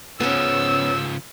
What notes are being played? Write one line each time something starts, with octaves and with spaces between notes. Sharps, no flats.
C#3 F3 B3 C#4 E6